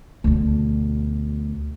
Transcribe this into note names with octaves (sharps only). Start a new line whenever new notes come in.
D2 B2